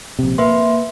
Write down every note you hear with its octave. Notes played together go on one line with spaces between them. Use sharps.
A#1 C3
A#3 B4 E5 C6